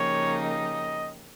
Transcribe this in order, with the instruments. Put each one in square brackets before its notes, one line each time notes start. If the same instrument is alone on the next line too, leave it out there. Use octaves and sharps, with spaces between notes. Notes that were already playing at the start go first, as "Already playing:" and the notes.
Already playing: [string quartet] C#3 F3 A#3 D#4 G4 [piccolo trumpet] C#5
[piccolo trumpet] D#5